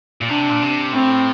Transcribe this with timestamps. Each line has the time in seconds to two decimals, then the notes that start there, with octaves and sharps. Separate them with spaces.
0.21 A#2
0.29 C3 D4
0.50 A#2
0.62 C3
0.93 A2 C4